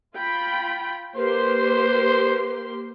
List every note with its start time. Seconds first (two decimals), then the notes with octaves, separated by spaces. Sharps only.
0.16 F4 G5 B5
1.16 A#3 G4 B4 C5 C6